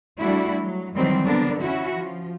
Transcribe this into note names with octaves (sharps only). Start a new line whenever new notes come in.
G3 A3 D4 E4 F#4
F#3
D#3 E3 F#3 G3 C4
D3 B3 D4 A#4
C#4 E4 F#4
F3